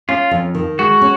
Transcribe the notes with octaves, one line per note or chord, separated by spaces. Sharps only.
C#4 F4
F2
D#3
G#3 F#4
C#4